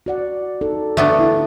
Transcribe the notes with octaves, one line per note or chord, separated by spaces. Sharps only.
F#4 D5 F#5
D#4 A4
D3 A3 B3 D4
E4